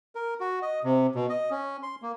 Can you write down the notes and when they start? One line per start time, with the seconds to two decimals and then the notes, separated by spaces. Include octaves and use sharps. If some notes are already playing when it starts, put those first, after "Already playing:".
0.15 A#4
0.40 F#4
0.62 D#5
0.84 C3
1.15 B2
1.29 D#5
1.51 C#4
1.83 C6
2.02 A#3